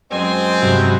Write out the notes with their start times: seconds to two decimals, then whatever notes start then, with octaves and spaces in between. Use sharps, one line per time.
0.12 F#2 G#3 C4 D#5 G#5
0.62 G2 C3 F#3